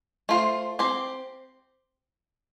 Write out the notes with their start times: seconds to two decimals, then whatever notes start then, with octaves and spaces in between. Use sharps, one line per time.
0.29 A3 F4 C5
0.79 C4 G4 C5